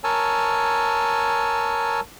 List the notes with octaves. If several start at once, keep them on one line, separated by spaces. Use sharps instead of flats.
A#4 C#5 G#5 A5 E6